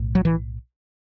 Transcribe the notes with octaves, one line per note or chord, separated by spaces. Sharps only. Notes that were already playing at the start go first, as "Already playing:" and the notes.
Already playing: B1 A2
F#3
E3